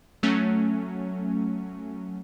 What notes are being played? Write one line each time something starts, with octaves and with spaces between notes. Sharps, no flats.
F#3 A3 C#4